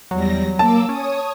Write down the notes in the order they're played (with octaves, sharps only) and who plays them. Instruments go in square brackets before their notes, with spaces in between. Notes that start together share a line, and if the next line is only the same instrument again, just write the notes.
[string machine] E2 G3 A#6 [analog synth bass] F#3
[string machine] A#3 D6 E6 [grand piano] A5
[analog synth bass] C#4 [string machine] C#5 D#6